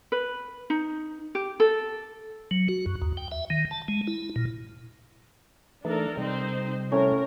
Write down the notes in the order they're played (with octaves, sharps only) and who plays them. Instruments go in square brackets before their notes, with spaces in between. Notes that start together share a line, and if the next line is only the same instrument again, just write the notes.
[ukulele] B4
D#4
G4
A4
[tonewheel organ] F#3
F#4
F#2
D#2
G5
E5
D#3
A5
G#3
E4
A#2
[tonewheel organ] E3 A3 D#4 [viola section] D4 A4 A#4
[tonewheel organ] C3 G3 [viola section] C4 D#4 C5
[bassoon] A2 [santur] C#4 [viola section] A#4